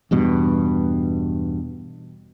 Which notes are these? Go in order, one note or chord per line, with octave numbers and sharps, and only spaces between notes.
E2 G2 B2